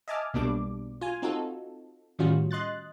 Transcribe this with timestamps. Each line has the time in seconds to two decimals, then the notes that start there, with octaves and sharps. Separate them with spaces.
0.08 D#5 E5 G#5 A5 D6 F6
0.34 B1 B2 G3 A#3 D4 D6
1.01 F4 G#5
1.22 C4 D#4 F4 F#4 A4
2.19 A2 D#3 G3 C#4 F4 F#4
2.51 D#5 C6 F#6 A6